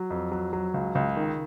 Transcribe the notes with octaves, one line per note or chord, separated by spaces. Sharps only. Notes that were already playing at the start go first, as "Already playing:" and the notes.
Already playing: F#3
F2
F#3
F#3
C#2
C#2
D#3